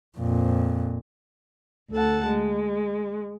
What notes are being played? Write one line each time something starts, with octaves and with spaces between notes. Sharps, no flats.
F2 A#2
D2 A4 F#5 A5
G#3